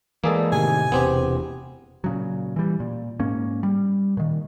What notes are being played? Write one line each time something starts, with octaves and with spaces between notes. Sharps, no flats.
E3 G#3 A#3 G#4 A4 D5
A2 C3 D#3 G#5
E1 B3 C4 G4
A#2 C#3 F#3
E3 G3
A#2
G#2 A#3 C#4
G3
A#2 D#3